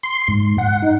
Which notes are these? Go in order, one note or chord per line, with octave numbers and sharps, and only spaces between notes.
C6
G#2
F#5
D#4